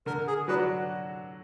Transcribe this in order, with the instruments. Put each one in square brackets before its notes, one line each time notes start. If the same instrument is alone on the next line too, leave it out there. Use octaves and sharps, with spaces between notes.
[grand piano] D3 [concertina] A#4
[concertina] G#4
[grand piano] F#3 D4 F#4 [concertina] B4